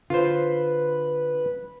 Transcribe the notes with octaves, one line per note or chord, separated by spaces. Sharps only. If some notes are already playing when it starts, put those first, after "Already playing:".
D3 F4 B4 C5